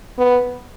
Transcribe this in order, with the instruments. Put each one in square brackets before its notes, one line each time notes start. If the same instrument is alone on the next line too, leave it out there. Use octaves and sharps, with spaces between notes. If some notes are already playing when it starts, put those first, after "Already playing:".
[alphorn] B3